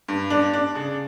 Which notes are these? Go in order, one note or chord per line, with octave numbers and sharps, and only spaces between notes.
G2
D4
D4
C#3